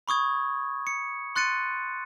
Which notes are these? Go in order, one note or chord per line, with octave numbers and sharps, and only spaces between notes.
B5 C#6 D#6 G#6
C#7
C6 F#6 A6 C#7 D#7